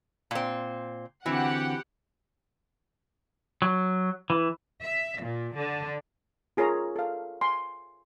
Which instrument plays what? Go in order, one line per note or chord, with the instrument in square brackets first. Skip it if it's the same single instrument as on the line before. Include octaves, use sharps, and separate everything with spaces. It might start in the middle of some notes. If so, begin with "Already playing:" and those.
[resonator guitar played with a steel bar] A#2 C4
[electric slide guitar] D3 C4 F#4 [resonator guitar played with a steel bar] E3 [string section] G4 F#5
[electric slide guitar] F#3
E3
[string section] E5
A#2
D3
[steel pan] F4 G#4 A#4 C#5 A#5
A4 F5
G#5 C6